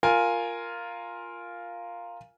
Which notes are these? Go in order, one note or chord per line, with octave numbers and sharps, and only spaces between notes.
F4 A#4 G#5